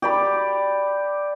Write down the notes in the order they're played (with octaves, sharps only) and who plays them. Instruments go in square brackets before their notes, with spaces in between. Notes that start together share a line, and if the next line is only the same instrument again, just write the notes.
[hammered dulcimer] G4 D5 B5